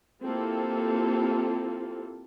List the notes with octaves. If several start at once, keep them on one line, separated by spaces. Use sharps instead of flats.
A#3 C4 E4 F4 G4 A4